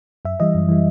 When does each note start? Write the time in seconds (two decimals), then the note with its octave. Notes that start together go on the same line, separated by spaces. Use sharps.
0.25 F#2 E5
0.40 E3 G3 D#5
0.55 F#2
0.69 E3 G3